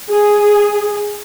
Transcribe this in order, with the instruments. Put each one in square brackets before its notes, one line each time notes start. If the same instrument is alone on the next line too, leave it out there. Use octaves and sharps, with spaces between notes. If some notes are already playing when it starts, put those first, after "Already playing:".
[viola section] G#4